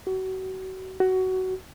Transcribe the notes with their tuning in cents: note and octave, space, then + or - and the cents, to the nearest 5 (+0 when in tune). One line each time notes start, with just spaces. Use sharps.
F#4 +30
F#4 +15